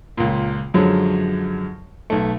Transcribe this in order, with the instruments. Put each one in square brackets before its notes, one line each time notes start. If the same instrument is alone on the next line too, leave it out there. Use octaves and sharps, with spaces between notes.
[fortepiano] C#2 A#2
F#2 D3 F3 F#3 G#3
B1 A3